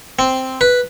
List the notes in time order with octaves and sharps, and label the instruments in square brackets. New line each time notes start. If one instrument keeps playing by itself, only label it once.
[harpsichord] C4
B4